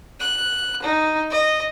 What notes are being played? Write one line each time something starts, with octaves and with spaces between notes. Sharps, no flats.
F#6
D#4
D#5